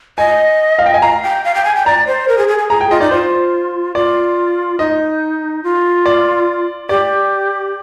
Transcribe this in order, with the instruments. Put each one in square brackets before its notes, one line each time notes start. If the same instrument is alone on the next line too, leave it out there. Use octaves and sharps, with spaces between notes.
[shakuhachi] D#5 [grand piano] G#5
[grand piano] F5
G5
G#5
[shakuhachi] F5 [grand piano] A#5
[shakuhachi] G5
F5
G5
G#5
G5
[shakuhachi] D5 [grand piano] A#5
[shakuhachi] C5
A#4
G#4
G#4
G#4
[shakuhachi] G#4 [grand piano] A#5
[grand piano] G5
[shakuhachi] F4 [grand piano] D#5
[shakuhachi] D#4 [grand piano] D5
[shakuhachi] F4 [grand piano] C5
[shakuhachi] F4 [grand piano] D5
[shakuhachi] D#4 [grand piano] D#5
[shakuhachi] F4
[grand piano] D5
[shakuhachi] G4 [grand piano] D5